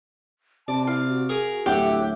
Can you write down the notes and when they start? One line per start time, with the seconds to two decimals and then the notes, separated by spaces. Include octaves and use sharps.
0.68 C3 D5 A5
0.87 E4 F5
1.09 F#4
1.29 G#4 A#4
1.66 D1 A2 G4 E5 F#5